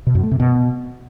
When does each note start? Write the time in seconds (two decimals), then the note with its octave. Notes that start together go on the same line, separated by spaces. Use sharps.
0.07 B2
0.15 F#2
0.23 A3
0.31 C3
0.40 B2